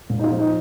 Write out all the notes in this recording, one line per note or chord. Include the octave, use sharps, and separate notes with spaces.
A#2
D#4
F4
F3
D#4